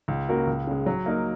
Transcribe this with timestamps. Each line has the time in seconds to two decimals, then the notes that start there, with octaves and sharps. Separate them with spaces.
0.08 C#2
0.28 C#3 A#3 F#4 A#4
0.47 C#2
0.67 C#3 G#3
0.86 F#3
1.06 A#3 D#4 A#4